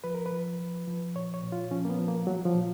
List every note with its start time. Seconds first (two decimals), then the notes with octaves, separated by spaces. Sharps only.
0.04 F3 B4
0.15 A#4
0.26 B4
0.32 F3
0.60 F3
0.88 F3
1.15 A#2 C#5
1.34 C#5
1.43 A#2
1.52 F4
1.71 F3 C#4
1.85 A#3
1.89 B3
1.99 F3
2.08 A#3
2.26 F3 F#3
2.45 F3
2.54 A#2